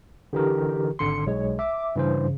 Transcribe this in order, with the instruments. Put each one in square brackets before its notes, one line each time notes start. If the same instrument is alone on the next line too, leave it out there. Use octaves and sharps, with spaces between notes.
[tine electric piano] D3 E3 A#4 [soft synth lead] G4
[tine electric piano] G#1 D3 C6 [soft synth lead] C#7
[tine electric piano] B1 G#3 [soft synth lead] C#5
[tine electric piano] E5 [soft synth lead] D6
[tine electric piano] G2 E3 C5 [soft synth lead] C#3